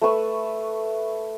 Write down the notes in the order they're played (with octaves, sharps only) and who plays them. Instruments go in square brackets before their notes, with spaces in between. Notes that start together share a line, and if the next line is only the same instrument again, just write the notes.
[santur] A3 B4 C#6 E6